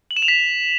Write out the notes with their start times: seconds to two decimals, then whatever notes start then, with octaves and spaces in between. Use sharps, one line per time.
0.11 F#7
0.16 E7
0.22 F7
0.28 B6